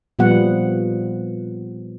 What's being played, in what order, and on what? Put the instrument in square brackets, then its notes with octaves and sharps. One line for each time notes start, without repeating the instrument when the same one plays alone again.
[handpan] A#2 F3 G3 B3 F#5